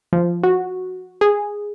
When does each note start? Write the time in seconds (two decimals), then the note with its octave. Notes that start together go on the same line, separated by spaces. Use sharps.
0.13 F3
0.43 F#4
1.21 G#4